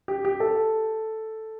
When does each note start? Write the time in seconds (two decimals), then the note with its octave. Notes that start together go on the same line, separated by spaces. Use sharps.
0.08 G4
0.25 G4
0.40 A4